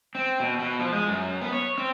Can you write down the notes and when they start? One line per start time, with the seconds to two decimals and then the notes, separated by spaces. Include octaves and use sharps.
0.15 C4
0.40 B2
0.59 B2
0.79 F3
0.92 G#3
1.08 F#2
1.41 B3
1.53 C#5
1.78 C4